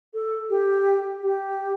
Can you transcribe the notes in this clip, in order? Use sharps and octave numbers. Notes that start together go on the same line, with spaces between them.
A4
G4
G4